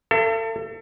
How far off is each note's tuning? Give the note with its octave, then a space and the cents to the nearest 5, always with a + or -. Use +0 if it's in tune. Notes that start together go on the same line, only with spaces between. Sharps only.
A4 +35 E5 +45